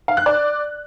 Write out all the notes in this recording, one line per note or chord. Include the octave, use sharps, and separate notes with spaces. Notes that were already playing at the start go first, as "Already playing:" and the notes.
F5
F#6
D5